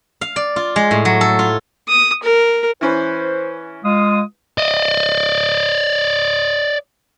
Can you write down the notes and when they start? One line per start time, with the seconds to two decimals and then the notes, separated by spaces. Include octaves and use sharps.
0.21 F5
0.36 D5
0.56 F4
0.76 G#3
0.91 A2
1.05 F#3
1.21 A4
1.39 F4
1.88 D#6
2.23 A#4
2.81 E3 C#4 B4 C5
3.85 G#3 F4 F5 D#6
4.58 D5 D#5